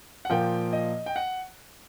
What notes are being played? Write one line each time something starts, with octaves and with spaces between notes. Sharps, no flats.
F#5
A#2 F3 A#3 G5
D#5
G5
F#5